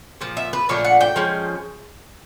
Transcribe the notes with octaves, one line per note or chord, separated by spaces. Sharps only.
A#2 F3
E5
B4
A#2 F3 A3 D4 C#5
F#5
G5
F3 G#3 C#4